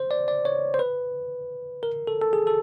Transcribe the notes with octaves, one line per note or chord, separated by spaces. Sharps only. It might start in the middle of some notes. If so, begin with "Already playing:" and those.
Already playing: C5
D5
D5
C#5
C5
B4
A#4
A4
A4
G#4
A4